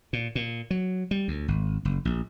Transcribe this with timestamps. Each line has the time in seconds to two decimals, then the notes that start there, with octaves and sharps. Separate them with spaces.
0.13 A#2
0.35 A#2
0.71 F#3
1.11 G3
1.28 D2
1.48 G#1
1.85 F#1
2.05 A#1